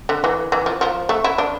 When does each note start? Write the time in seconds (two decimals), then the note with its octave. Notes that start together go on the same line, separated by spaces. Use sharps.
0.09 D3
0.24 E3
0.52 E3
0.66 F3
0.81 F3
1.09 A3
1.24 E4
1.38 D4